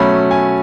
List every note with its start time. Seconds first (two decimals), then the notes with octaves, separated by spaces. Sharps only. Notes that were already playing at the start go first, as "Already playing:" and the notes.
Already playing: B2 F#3 A3 C#4 B5
0.31 G#5